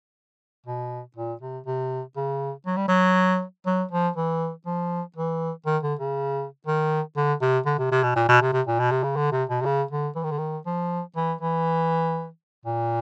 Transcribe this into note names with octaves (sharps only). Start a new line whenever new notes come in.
B2
A#2
C3
C3
C#3
F#3
G3
F#3
F#3
F3
E3
F3
E3
D#3
D3
C#3
D#3
D3
C3
D3
C3
C3
B2
A#2
B2
C3
C3
A#2
B2
C3
C#3
D3
C3
B2
C3
C#3
D3
E3
D#3
D3
D#3
F3
E3
E3
A#2